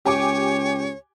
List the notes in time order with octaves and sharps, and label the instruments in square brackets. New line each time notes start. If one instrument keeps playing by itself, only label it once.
[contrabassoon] C#2 [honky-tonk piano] G4 G#5 D6 [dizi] C#5